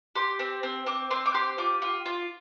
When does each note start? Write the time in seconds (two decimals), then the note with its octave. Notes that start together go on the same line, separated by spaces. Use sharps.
0.15 G4 C6
0.39 C4
0.63 C4
0.86 C4 D6
1.11 C4 C6
1.26 D6
1.34 G4 C6
1.58 F4 D6
1.82 F4
2.06 F4